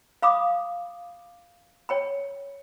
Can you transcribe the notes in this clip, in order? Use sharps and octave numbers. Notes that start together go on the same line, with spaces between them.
F5 B5 D6 D#6
C#5 G5 B5